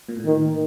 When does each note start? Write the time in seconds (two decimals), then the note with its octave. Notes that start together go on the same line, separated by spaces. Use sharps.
0.09 A#2
0.17 A2
0.25 D#3